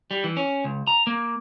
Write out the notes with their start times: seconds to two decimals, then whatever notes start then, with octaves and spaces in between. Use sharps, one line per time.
0.11 G3
0.24 E3
0.37 C#4
0.64 C#2
0.87 A#5
1.07 A#3